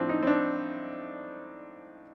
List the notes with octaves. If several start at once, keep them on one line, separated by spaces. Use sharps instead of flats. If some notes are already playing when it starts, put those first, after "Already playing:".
Already playing: A2 F3 C4 D4
D#4
C4
D4